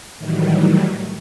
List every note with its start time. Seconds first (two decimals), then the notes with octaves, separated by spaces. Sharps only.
0.17 A2 D#3 E3 F#3 G3